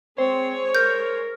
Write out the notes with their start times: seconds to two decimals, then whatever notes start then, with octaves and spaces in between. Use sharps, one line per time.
0.18 G#3 C4 C5 C#5
0.75 A#4 G6